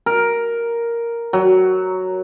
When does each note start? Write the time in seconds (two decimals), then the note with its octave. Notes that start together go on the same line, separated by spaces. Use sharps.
0.06 A#4
1.33 F#3